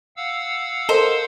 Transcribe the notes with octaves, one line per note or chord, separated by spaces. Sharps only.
F5 F#5 E6
A4 A#4 C5 D#5